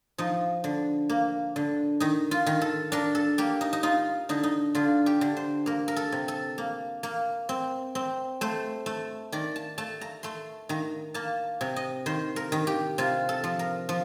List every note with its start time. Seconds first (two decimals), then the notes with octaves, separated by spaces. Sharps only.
0.18 F3 D#4
0.64 D3
1.09 A#3
1.56 D3
2.00 D#3 D#4
2.31 F4
2.46 D#3
2.61 A4
2.92 D4 A#4
3.15 A4
3.38 A#3 G4
3.61 D#4
3.73 D#4
3.83 D#4 F4
4.29 D3 D#4
4.43 D#4
4.75 D3 F4
5.06 G4
5.21 D3
5.37 C5
5.66 A#3 A#4
5.88 A#4
5.96 A4
6.12 C3
6.28 A4
6.58 A#3
7.03 A#3
7.49 C4
7.95 C4
8.41 A3 C5
8.86 A3
9.32 D#3 D5
9.56 A5
9.78 A3 A5
10.01 A#5
10.23 A3 C6
10.69 D#3 A#5
11.14 A#3 A5
11.61 C3
11.76 D#5
12.06 D#3 C5
12.36 A#4
12.52 D#3
12.67 G4
12.98 C3 F4
13.29 A4
13.44 F3
13.59 A#4
13.89 F3